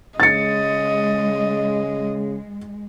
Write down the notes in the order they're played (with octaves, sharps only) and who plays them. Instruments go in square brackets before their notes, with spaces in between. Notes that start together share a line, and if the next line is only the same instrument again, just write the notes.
[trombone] C#3 [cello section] G#3 [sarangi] D#5 [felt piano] A6 C#7